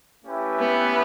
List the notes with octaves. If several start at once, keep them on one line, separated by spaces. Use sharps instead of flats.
A3 C#4 E4 G4 B4
B3